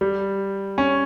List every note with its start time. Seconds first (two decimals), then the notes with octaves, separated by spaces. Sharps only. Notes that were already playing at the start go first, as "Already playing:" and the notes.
0.01 G3
0.78 C#4